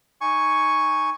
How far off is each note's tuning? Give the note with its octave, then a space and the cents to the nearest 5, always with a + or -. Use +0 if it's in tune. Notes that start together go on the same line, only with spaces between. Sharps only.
D#4 +0 G#5 +0 C#6 +0